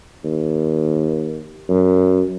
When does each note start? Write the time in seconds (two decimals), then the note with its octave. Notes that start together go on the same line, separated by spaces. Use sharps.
0.24 D#2
1.69 F#2